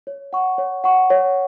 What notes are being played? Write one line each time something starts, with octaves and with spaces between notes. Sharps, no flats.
C#5
F#5 C#6
C#5
F#5 C#6
C#5